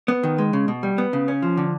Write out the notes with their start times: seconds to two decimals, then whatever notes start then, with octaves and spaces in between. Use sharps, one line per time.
0.08 B3
0.23 D#3
0.38 G#3
0.53 C#3
0.68 B2
0.83 G3
0.98 B3
1.13 C#3
1.28 C#4
1.42 F3
1.57 D3